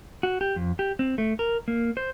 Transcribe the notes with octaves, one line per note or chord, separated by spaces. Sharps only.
F#4
G4
F2
G4
C4
A3
A#4
A#3
C5